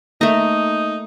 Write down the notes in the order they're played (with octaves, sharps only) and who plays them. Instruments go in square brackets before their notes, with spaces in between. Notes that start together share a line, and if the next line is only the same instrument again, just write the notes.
[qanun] A3 A#5 [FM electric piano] A#3 [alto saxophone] D#4